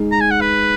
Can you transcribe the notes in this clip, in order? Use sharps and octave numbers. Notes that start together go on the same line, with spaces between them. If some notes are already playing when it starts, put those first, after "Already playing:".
Already playing: G#3 D#4 G#4
A#5
G#5
F#5
B4